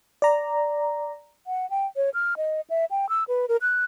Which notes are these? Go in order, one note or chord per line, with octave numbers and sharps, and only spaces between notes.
D5 A#5
F#5
G5
C#5
F6
D#5
E5
G5
E6
B4
A#4
F#6